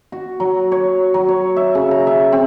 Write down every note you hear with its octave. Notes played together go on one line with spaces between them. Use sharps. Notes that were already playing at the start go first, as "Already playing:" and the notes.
F#4
F#3
C#5
F#3
C#5
E5
C#3
A#5
E5
C4